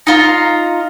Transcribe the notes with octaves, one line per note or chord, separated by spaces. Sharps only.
D#4 F4 A#5